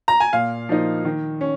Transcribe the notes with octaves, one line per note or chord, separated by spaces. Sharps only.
A#5
G#5
A#2 F5
F3 A#3 D#4
D#3
C#4